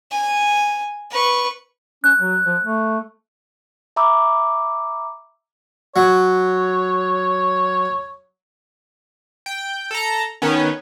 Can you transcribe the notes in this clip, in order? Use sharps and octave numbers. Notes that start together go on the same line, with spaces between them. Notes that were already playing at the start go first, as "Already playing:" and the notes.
G#5
B4 C#6
C#4 F#6
F#3
F3
A3
E5 A#5 B5 D6 E6
F#3 C#5
G5
A4 A#5
D#3 B3 C#4